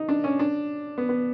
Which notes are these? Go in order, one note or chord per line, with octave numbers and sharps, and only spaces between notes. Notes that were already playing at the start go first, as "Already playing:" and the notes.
Already playing: D#4
D4
C#4
D4
B3
B3